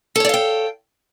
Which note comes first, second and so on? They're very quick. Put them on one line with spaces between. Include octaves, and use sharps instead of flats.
A4 C#5 D5 F5 G5